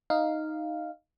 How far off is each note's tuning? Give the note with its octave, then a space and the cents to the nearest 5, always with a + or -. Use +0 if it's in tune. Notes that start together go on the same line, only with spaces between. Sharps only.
D#4 +0 F5 -5